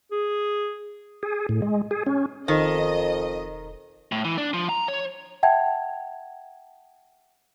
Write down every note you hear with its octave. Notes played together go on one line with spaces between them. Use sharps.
G#4
G#4
A2
G#3
G#4
C#4
E1 F2 D#3 D#5
A2
E3
D4
F3
A#5
C#5
E5 F#5 G5 A5 G#6